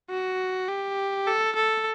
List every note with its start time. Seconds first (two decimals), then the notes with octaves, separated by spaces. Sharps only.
0.10 F#4
0.69 G4
1.27 A4
1.56 A4